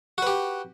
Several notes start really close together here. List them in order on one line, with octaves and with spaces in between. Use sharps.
F#4 B4 G4